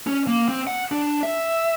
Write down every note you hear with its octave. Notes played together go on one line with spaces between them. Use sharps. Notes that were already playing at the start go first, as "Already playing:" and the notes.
C#4
A#3
C4
F#5
D4
E5